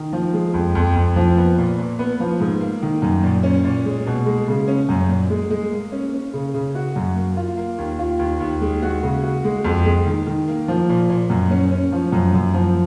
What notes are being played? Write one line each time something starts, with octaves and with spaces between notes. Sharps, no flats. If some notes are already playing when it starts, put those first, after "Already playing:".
Already playing: D#3
F3
G#3
F2
F2
F2
F3
B3
A#2
A#2
B3
F3
G#2
A#3
D#3
F#2
A#2
C#4
A#2
G#3
B2
G#3
C#3
C#4
F#2
A#2
G#3
G#3
A#3
C#4
C#4
C#3
C#3
F#4
F#2
A#3
F4
A#3
D#2
F4
D#2
D#2
G#3
F#4
C#3
F#4
G#3
F2
G#3
D#3
D#3
A#3
F3
A#2
A#2
F#2
C#4
C#4
F3
F#2
F#2
F3